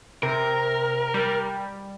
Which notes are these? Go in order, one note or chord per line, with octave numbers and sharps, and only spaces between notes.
C3 A#4
G3